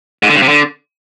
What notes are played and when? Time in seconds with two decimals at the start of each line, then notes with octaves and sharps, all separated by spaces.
0.23 G#2
0.29 D3
0.36 G2
0.42 C3
0.48 D3